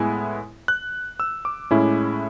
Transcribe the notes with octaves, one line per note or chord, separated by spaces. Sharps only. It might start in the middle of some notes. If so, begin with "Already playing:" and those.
Already playing: A2 G#3 B3 E4 G#5
F#6
E6
D6
A2 G#3 C#4 E4